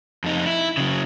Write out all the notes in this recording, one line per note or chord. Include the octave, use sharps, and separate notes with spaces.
F2 D#4
E4
C#3 F#3